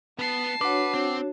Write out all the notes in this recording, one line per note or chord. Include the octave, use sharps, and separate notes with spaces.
B3 A5 C7
D4 F#4 B4 C#5 F#5 D6
C4